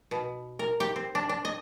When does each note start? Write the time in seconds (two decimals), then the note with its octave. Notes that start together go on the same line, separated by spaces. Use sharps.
0.11 B2
0.59 A#4
0.80 G4
0.96 C4
1.15 D4
1.29 D4
1.45 D#5